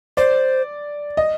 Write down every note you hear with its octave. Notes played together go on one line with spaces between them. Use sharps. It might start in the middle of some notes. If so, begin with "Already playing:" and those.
C5 D5
D#5